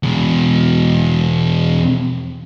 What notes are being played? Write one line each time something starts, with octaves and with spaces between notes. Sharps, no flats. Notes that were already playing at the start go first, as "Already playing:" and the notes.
E2 B2